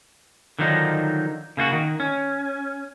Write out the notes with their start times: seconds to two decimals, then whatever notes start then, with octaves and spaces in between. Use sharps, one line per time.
0.59 D3 D#3 F3 F#3 D#4
1.57 C#3 A#3 F4 F#4
1.72 D#3
2.00 C#4